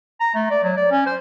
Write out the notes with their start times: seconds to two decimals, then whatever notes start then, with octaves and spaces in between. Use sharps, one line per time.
0.21 A#5
0.35 A3
0.51 D5
0.63 F#3
0.77 D5
0.91 C#4
1.06 C5